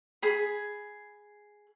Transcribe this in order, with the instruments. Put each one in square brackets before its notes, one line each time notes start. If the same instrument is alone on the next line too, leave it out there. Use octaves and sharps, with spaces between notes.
[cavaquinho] G#4 B5